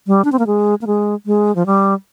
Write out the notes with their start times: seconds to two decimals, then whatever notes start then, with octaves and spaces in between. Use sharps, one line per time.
0.07 G3
0.24 D4
0.32 C4
0.39 A#3
0.47 G#3
0.81 A#3
0.87 G#3
1.26 G#3
1.56 F3
1.66 G3